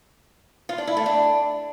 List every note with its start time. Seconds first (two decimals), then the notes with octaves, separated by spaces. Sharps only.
0.69 F4
0.78 D4
0.87 E4
0.97 A3
1.06 D4